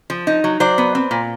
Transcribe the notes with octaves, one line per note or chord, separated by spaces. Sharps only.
F3
D#4
F#3
F#3 C5 D5
B3
C4
A#2